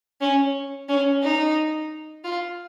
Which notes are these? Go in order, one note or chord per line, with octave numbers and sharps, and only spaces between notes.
C#4
C#4
D#4
F4